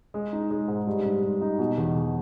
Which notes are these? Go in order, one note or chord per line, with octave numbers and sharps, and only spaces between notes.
G#3
D#4
G#3
G#2
G2
G2
G2
D#4
B2
E2
E2